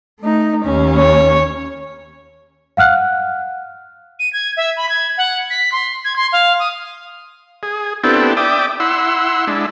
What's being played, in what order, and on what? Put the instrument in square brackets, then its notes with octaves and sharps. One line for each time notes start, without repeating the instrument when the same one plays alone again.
[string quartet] A3 D#4
D#2 C#4
[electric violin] C#5
[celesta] F5 F#5 F6 F#6
[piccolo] D#7
G#6
E5
B5
G#6
F#5
B6
C6
G#6
C6
F5
D#6
[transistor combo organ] G#4
B3 C4 D4 E4 G4 A4
D5 E5 G5 D6 D#6
E4 F#5 C6 E6
G#3 D4 E4